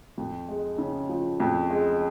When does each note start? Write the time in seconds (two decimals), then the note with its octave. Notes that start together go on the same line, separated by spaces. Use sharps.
0.17 F2
0.49 G#3
0.78 C#3
1.09 F3
1.40 F2
1.70 G#3